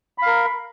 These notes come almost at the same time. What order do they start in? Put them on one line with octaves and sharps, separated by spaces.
B5 F5 A#4